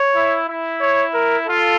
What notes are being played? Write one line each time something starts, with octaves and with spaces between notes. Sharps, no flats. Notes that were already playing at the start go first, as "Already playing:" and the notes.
Already playing: C#5
E4
E4
C#5
A#4
F4 A4